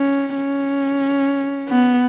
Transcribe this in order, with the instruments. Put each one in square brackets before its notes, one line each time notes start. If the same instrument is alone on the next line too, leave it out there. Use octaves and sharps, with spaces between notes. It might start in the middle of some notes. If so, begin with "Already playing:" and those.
Already playing: [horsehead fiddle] C#4
C#4
B3